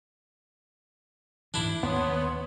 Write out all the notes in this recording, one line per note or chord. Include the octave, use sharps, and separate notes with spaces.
G#2 E3 D4 E4
D#2 B3 C#5 C6 D#6